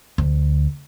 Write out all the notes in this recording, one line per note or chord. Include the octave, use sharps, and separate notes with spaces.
D2